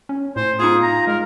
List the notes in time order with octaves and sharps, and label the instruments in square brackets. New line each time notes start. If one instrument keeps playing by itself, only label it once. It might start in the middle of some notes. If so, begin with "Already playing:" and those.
[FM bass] C#4
[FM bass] A2 [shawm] C5
[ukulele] D#4 F4 [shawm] G#4
[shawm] A#5
[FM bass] G#3 [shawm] A#4